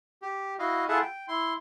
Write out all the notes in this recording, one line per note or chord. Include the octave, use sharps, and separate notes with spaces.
G4
E4 F#4 D#5 F5
E4 F4 G#4 A4 E5 F#5
G5
E4 C6